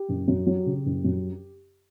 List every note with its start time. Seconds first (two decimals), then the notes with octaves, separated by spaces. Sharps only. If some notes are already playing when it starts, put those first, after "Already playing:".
Already playing: G4
0.08 F#1
0.28 F#2
0.47 F#3
0.66 C#3
0.85 F#1
1.04 F#2